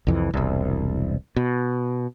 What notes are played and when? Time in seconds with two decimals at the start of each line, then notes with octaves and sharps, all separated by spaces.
0.07 C2 F2 E3
0.34 E1 C2
1.36 B2